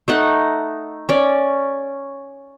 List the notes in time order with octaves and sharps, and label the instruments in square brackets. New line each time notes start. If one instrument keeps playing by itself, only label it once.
[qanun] A3 D#4 F#5
C#4 D5